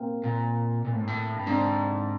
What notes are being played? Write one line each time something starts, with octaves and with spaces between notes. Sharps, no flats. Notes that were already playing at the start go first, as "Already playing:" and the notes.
Already playing: A#3 C4
A#2
A#2
A2
G#2
A2
G2
G#2 C4 D4